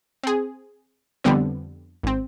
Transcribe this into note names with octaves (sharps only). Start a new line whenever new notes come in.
C4 G#4
F2 D3 G3 B3 C4
G#1 C4